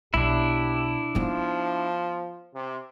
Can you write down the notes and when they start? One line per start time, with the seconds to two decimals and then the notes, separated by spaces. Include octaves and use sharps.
0.14 B1 D4 E4 G4
1.15 F3 B3 D#4
2.54 C3